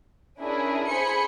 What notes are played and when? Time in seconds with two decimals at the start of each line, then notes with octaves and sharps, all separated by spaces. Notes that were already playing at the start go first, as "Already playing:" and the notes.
0.39 C#4 D4 E4 G#4 A#4
0.88 G#4 C5 G#5 B5 C6 C#7